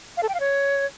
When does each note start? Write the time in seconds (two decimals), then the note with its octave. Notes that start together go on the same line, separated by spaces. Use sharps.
0.17 F5
0.23 A4
0.29 G5
0.34 F5
0.40 C#5